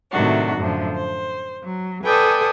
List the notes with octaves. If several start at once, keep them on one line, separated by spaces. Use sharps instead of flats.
A2 C3 D#3 F#3 D4 F#4
F#2 A2 D3 F3
C5
F#3
A4 B4 D5 G5 G#5 D#6